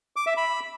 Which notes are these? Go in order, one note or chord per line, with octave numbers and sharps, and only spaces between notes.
D6
E5
B5